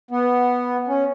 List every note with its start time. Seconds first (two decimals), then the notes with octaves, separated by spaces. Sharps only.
0.11 B3
0.88 C#4